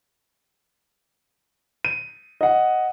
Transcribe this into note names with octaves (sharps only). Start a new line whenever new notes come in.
D#7
D#5 F#5